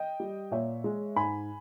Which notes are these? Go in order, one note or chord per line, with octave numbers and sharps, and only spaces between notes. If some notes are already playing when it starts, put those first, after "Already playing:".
Already playing: D#5 G5
G3
A#2 C#5 E5
G#3
G#2 G#5 B5